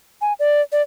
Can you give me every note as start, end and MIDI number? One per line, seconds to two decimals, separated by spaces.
0.21 0.33 80
0.40 0.61 74
0.72 0.82 74